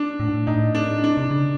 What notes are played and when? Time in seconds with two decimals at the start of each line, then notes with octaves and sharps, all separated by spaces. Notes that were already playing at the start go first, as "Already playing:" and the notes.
Already playing: D4
0.20 A2
0.27 G#2
0.34 A2
0.47 A2 D#4
0.75 D4
1.04 D4
1.17 C3
1.31 C#3